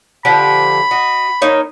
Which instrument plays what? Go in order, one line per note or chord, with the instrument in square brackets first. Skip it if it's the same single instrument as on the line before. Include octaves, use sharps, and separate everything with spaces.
[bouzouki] D3 F3 G4 [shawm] B5
[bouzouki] F#4 D#5
A#3 D#4 C#5